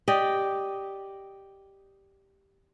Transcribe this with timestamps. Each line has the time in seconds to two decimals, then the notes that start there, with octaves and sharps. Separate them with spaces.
0.08 G4 D5 D#5